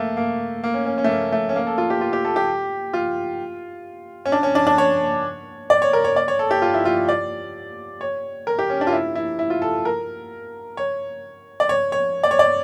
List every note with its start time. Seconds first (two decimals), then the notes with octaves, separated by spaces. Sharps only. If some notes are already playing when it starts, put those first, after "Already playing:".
Already playing: A3 A#3
0.17 A#3
0.64 A#3
0.74 C#4
0.86 C#4
0.98 C#4
1.04 A3
1.09 A#3
1.32 A3
1.49 C#4
1.56 A#3
1.67 A4
1.78 F4
1.90 G4
2.01 F4
2.13 G4
2.25 A4
2.36 G4
2.93 F4
4.26 C#4
4.32 D4
4.43 C#4
4.55 D4
4.67 D4
4.78 C#5
5.70 D5
5.82 C#5
5.93 A#4
6.04 C#5
6.16 D5
6.28 C#5
6.39 A4
6.51 G4
6.62 F4
6.74 E4
6.85 F4
7.09 D5
8.01 C#5
8.47 A#4
8.59 G4
8.70 C#4
8.81 D4
8.87 F4
8.92 E4
9.15 E4
9.39 E4
9.50 F4
9.62 A4
9.85 A#4
10.77 C#5
11.60 D5
11.69 C#5
11.92 C#5
12.23 D5
12.31 C#5
12.39 D5